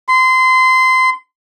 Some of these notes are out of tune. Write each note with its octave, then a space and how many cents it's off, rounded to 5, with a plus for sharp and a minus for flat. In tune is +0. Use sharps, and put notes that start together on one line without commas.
C6 -25